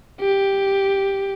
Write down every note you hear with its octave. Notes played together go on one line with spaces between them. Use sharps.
G4